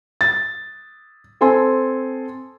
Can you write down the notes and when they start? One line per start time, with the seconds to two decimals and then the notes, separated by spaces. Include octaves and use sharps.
0.21 A6
1.41 C4 A4 G#5 C6